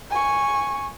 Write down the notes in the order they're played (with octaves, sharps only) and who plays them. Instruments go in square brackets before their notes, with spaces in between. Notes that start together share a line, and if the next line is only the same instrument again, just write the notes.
[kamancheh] G#5 C#6